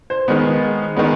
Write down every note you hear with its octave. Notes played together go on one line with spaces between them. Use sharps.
C5
D#3 G#3 B3
D#3 G#3 B3